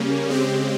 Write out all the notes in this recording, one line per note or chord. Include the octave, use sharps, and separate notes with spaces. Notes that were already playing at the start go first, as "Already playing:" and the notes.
Already playing: C#3 G3 A#3 C#4
C#3 G#3 C4 G4